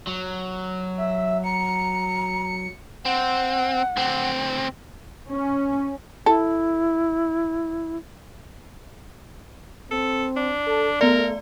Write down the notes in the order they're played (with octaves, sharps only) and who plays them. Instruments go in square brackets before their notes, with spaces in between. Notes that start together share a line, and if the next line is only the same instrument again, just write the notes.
[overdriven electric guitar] F#3
[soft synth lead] E5
[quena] A#5 [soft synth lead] C#7
[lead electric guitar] C4 [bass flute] F#5
[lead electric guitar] D2 C4
[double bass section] C#4
[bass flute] E4 [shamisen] A4
[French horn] C4 [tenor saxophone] A4
[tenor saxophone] D4
[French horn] A4
[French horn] A3 [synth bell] B3 D5 [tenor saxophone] A#4